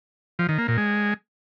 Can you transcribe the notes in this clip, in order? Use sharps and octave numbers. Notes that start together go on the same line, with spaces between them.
F3
D#3
A#3
A#2
G#3